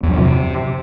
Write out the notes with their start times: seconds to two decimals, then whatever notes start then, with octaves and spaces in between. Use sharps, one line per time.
0.03 E2
0.08 F#3
0.13 F#2
0.18 C3